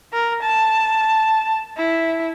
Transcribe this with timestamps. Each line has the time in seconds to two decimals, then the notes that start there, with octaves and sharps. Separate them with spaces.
0.13 A#4
0.42 A5
1.77 E4